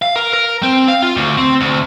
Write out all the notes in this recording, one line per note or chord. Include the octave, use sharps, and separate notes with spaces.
F5
A#4
A#4
C4
F5
F4
D2
C4
D2